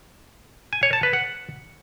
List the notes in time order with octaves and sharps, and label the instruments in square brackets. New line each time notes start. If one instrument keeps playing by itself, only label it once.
[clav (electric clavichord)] G#5
C#5
A5
B4
F#5